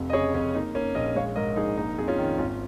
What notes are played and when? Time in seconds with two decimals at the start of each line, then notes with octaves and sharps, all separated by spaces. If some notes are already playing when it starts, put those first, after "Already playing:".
Already playing: F1 F2
0.10 D#5
0.13 C#3 G#4 C#5
0.34 F2 C#4
0.54 A#3 D#4
0.75 A#3 C#4
0.95 A#1 A#4 D#5
1.15 G#3 C#5 F5
1.36 G#2 A#4 D#5
1.56 A#1 D#4 G#4
1.77 A#3 D#4
1.98 F2 G#4
2.08 C#4 F4
2.18 D#3
2.38 G#1 C#4 F4